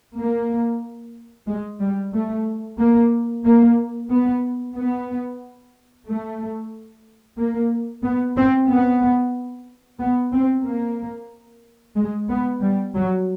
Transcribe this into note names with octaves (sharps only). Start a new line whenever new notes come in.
A#3
G#3
G3
A3
A#3
A#3
B3
B3
A3
A#3
B3
C4
B3
B3
C4
A#3
G#3
B3
G3
F#3